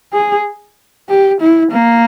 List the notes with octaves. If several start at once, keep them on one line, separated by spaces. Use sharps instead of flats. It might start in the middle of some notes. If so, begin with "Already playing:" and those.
G#4
G4
E4
A#3